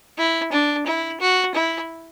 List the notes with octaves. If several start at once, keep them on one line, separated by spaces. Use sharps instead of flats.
E4
D4
E4
F#4
E4